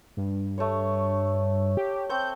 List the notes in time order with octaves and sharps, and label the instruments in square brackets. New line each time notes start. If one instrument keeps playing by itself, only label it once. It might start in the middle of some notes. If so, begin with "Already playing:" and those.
[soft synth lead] G2
[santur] A3 C#5
[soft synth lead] G4
[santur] C4 A5 C#6 [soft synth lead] G6